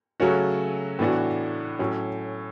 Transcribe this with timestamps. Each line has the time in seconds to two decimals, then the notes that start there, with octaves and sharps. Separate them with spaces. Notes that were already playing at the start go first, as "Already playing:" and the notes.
0.20 C#3 F#3 A3 C#4 F#4
0.99 A2 E3 B3 D4 F#4
1.79 A2 F#3 C#4